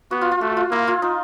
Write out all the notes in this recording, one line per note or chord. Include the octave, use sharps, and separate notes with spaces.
B3 F#4
F4
F4
A3 F#4
F4
A#3 E4
F4
D#4